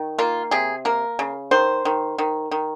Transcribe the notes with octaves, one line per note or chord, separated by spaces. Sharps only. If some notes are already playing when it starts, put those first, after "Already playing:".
Already playing: D#3
A#3 F4
C3 G#4
A#3 A#4
C#3
D#3 C5
D#3
D#3
D#3